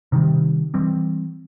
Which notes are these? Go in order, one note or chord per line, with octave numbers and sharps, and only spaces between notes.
C3 D#3 G3
E3 G3 C4